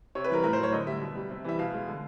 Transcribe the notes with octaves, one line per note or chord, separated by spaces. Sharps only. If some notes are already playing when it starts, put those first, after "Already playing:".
C3 C#5
B4
E3 G3 A#4
A2 A#4
C5
F#3
C#5
D3 D#5
G3 E5
B2
G3
C3
E3 G3 E5
B2 F5
G#3
D3